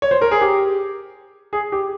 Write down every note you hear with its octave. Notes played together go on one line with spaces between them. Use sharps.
C#5
C5
A#4
G#4
G4
G#4
G4